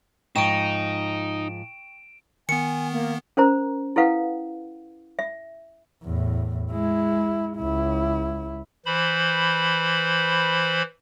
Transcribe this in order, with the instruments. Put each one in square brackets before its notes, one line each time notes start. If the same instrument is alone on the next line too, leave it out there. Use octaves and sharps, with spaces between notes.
[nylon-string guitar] G#2 F3 [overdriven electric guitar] D#4 [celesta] G5 C#6 [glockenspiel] D7 E7
[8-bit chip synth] D#3 B3 [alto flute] G#5 [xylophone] C#7
[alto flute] A#3
[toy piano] C#4 A#4 C5 A#5
E4 A4 B4 F5 F#5
E5
[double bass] E2 A2
G#3 E4
C#2 E4
[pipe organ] E3 C5 B5